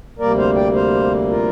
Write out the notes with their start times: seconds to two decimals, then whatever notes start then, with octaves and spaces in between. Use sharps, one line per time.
0.19 D2 C3 G3 A#3 A#4 D5
0.38 C5 F5
0.55 D5 G5
0.74 C5 F5
1.28 F4 A#4